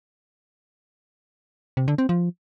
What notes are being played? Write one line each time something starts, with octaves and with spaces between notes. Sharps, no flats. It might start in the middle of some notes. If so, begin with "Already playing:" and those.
C3
D3
C4
F3